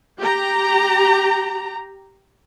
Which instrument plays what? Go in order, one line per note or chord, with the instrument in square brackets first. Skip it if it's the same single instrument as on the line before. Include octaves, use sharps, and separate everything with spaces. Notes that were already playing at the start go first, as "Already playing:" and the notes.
[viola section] G4 A#5